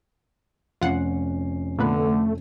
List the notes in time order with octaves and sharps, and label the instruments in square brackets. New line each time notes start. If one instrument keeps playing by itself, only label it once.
[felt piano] F1 C#4 C7 [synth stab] F4 F#5
[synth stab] A#2 B3 B4 [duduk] D3 [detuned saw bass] A3